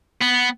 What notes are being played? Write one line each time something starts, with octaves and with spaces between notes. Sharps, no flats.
B3